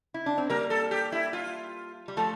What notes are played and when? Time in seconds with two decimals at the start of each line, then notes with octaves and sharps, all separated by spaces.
0.14 E4
0.26 D4
0.38 C4
0.50 G3 A#3 A#4
0.70 A4
0.91 G4
1.12 E4
1.33 F4
2.08 G3
2.17 F3 A3 A4